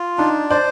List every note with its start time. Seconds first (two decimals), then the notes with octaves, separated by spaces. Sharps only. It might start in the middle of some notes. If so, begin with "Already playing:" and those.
Already playing: F4
0.18 D4 D#4
0.50 C5 D5